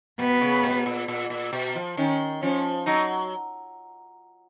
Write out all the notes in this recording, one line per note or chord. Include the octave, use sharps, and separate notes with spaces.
B2 B3
C#3
B2
A#2
A#2
A#2
B2
F3
D#3 C#4
F3 C#4
F#3 D#4